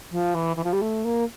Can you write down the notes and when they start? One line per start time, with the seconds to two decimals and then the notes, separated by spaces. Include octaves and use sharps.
0.11 F3
0.34 E3
0.56 E3
0.64 F3
0.72 G3
0.81 A3
1.04 A#3